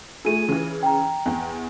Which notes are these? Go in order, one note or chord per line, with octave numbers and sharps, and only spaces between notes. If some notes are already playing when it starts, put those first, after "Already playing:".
A3 F4 G#4 D#7
C#3 E3
G5 A#5
E2